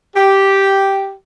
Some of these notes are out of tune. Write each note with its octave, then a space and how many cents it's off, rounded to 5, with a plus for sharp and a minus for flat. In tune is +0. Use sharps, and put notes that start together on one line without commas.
G4 -5